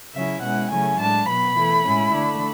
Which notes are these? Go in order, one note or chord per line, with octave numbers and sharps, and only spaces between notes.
C#3 F#3 C#4 E4 E5
B2 G#3 C#4 E4 F#5
C#3 F#3 A3 C#4 E4 G#5
A2 G#3 D4 A5
B2 F#3 B3 B5
E3 A3 E4
A2 G#3 C#4 E4
D3 A3 D4